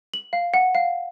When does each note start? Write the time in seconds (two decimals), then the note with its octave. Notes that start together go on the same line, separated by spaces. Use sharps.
0.14 F#7
0.33 F5
0.54 F#5
0.75 F5